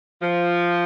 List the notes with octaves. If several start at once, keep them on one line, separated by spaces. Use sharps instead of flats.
F3